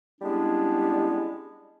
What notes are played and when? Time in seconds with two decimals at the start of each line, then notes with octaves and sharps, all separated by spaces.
0.21 G3 G#3 B3 C#4 D4 E4